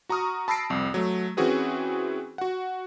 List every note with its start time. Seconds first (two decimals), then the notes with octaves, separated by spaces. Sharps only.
0.09 F#4 A#5 C#6 D#6 F6
0.48 A5 B5 E6 A#6 C7 D7
0.70 C2 F2
0.94 F#3 A3
1.37 E3 C4 C#4 F#4 G#4 B4
2.38 F#4 F#5